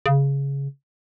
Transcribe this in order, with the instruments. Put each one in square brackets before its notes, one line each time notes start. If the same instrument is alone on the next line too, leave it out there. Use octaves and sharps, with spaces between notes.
[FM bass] C#3